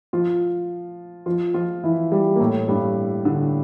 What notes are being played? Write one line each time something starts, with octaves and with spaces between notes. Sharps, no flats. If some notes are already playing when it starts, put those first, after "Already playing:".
F3 F4
F3 F4
F3 F4
E3 E4
G3 G4
A#3
A2 A3
G2 G3
D3